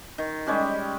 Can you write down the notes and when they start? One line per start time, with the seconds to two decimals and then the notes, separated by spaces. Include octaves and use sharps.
0.18 D#3
0.47 G3 G#3 C#4 G4